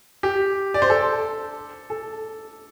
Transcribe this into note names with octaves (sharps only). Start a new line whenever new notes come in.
G4
D5
C5
A4
A4